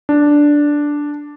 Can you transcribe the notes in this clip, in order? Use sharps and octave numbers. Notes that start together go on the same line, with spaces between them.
D4